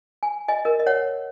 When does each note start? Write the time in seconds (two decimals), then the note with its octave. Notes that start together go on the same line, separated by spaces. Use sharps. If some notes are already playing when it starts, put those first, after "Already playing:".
0.23 G#5
0.48 D#5 G#5
0.65 A#4 D#5
0.80 D#5
0.86 C#5 F#5